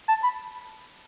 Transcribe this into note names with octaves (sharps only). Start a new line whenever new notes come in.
A5
B5